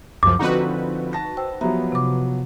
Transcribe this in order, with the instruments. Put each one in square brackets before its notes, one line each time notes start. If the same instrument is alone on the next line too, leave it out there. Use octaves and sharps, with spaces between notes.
[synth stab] C#2 F#2 F3 [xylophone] D6
[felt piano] D3 F3 C4 [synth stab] D#4 F#4 B4
[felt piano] A5 A#6
[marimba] C5 G5 E6
[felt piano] F3 F#3 B3 [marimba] G4 E5 A#5
[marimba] C3 D6